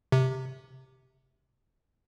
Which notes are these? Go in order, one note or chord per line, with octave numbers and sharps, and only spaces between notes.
C3